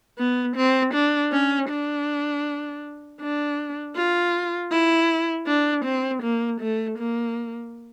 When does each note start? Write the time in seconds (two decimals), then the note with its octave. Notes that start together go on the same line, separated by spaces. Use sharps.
0.18 B3
0.56 C4
0.94 D4
1.32 C#4
1.69 D4
3.21 D4
3.96 F4
4.71 E4
5.47 D4
5.85 C4
6.22 A#3
6.60 A3
6.98 A#3